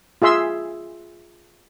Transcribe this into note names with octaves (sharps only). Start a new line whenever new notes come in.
F4 G#4 E5 C6 E6